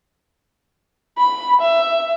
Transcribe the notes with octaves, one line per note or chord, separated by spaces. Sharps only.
B5
E5